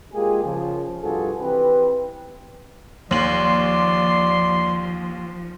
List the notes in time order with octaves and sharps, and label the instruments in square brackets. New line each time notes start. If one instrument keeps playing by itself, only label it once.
[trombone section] G#3 A#3 F4 G4 G#4
C#3 F3
C2 G2 F3 F#4 G#4 A4
E3 C4 G4 B4
[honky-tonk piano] D#2 F#7 [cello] F3 [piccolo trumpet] D5 [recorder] C6